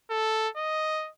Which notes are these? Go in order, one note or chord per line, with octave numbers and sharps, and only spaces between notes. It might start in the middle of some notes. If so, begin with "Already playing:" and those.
A4
D#5